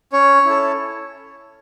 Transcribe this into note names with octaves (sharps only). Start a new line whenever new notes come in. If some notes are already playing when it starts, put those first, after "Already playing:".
C#4 C#5
E4 A4